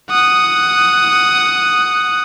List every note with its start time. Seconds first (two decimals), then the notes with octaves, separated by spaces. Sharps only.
0.10 F#5 D#6